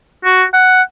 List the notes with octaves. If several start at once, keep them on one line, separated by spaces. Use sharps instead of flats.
F#4
F#5